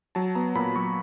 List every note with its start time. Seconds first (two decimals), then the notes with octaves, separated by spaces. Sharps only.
0.15 F#3 A5
0.35 B3 A#5
0.55 A#2 B5
0.76 F#3 C#6